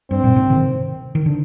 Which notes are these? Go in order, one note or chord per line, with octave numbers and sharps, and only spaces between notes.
G2 C4
G2 A#2
G#2 C3
C3 D#3
D#3
D3